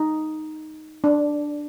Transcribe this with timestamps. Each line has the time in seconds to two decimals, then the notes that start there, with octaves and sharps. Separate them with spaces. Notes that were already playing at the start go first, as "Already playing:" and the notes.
Already playing: D#4
1.04 D4